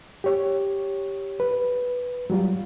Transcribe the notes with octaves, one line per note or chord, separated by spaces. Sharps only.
G4 C#5
B4
F#3 G3 F4